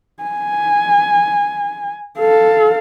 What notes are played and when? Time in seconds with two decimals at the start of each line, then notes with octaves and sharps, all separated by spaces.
0.23 G#5
2.19 A4 F5